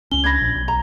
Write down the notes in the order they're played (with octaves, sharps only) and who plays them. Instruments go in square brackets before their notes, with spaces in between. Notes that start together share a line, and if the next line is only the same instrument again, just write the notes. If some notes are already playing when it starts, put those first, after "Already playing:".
[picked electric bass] C#2 C#4 [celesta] G7
[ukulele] D4 B5 [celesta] G#6 A#6
[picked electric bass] A#1
B1
[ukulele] A#5